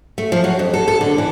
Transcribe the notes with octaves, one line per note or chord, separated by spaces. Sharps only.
A3
F3
F#3
F2
A4
A4
D3
E3